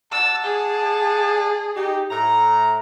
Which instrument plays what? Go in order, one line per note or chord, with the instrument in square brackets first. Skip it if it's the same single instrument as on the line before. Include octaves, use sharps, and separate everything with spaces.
[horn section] D5 F#5 A5 [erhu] E6
[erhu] G#4
[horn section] D#4 G4
A2 A#5